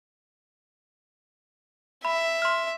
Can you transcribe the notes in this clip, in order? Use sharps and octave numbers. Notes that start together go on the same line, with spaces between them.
E5 B5
C6 F6